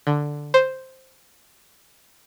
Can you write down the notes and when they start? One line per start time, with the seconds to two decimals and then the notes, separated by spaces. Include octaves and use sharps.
0.07 D3
0.54 C5